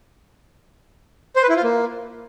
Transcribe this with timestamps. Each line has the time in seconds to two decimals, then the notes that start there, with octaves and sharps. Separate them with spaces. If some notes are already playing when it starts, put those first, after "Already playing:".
1.36 C5
1.43 B4
1.49 E4
1.56 F4
1.63 A#3